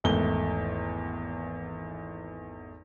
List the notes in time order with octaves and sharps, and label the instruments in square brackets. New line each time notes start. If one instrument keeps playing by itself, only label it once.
[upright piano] G#1 E2 A3 G7